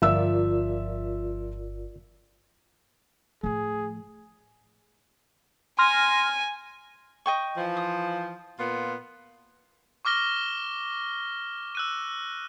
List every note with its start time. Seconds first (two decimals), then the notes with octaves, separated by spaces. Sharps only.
0.02 G1 F3 F4 A#4 D5 E5 E6
3.43 A2 F3 G#4
5.79 G#5 C6 F6 A#6
7.26 D#5 G5 C#6
7.57 E3 F3
7.77 D#6
8.59 A#2 B3 F4
10.05 C#6 D6 F6 A#6 G7
11.75 E6 F#6 D#7